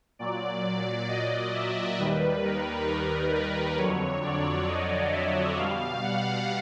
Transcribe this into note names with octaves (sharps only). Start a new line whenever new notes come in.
A#2 F#3 D5
D#5
E5
D#2 D#3 G3 B4
A#4
A#4
B4
F2 D3 F#3 C#5
D5
D#5
E5
B2 G3 F5
F#5